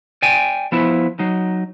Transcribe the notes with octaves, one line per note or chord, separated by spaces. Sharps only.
D5 G5 G#5
F3 B3 E4
F#3 D#4